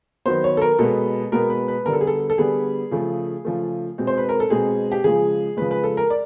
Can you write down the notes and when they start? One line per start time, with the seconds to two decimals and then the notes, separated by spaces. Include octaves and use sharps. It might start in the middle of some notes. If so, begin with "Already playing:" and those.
0.26 D#3 F#3 B3 C5
0.44 C#5
0.57 A4
0.61 A#4
0.79 B2 G#3 B3 A4
1.32 B2 G#3 B3 A#4
1.50 B4
1.68 B4
1.85 D3 G3 B3 A#4
1.93 A4
2.01 G#4
2.07 A4
2.30 A4
2.38 D3 G3 B3 G#4
2.91 C#3 F3 A3
3.45 C#3 F3 A3
3.98 B2 G#3 C4
4.07 C5
4.18 B4
4.29 A#4
4.40 A4
4.50 B2 G#3 C4 G#4
4.92 G4
5.04 C#3 F3 G#3 G#4
5.57 C#3 F3 G#3 B4
5.71 B4
5.84 A4
5.97 A#4
6.10 D5